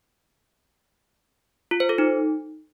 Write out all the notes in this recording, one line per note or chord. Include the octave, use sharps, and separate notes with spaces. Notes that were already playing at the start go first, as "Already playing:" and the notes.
F4
C5
A4
D#4